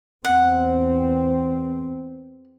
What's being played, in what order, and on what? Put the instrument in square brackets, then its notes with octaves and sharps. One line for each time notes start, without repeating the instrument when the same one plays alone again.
[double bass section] E2 C4 [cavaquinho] F#5